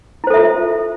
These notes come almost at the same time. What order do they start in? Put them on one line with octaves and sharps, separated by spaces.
E4 C5 A4 E5 F4